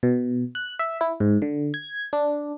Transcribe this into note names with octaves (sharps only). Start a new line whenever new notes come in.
B2
F#6
E5
E4
G#2
D3
G#6
D4